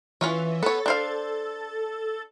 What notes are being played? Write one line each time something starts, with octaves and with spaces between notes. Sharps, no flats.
E3 C#4 F4 C#5
B3 A4 C#5
D4 C5 F5